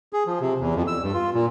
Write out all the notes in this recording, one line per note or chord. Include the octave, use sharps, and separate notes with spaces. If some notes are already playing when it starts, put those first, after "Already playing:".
G#4
F3
C3
E2
F2
E6
G2
F4
A#2